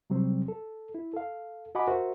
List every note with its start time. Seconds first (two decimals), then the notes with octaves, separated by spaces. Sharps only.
0.10 C3 F#3 G3 C4
0.48 A4
0.95 E4
1.13 A4 F5
1.75 F#4 D#5 F#5 G#5 B5 D6
1.88 F#4 A#4 C5 E5